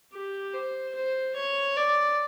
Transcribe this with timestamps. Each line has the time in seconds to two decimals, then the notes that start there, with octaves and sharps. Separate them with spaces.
0.13 G4
0.54 C5
0.95 C5
1.36 C#5
1.77 D5